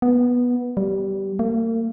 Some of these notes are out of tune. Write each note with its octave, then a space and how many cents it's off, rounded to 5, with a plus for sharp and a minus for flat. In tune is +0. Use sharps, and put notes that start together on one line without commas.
B3 -10
G3 -15
A#3 -40